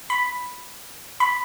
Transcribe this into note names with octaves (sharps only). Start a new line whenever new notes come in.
B5
B5